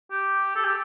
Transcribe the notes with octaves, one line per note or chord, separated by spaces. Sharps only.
G4
A4
G4